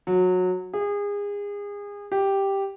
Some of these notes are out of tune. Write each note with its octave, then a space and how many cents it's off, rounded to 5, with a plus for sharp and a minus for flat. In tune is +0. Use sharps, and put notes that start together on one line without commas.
F#3 -20
G#4 -30
G4 +0